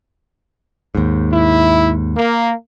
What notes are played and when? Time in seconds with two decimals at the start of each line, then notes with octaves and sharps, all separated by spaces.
0.95 D#2 G#2
1.33 E4
2.16 A#3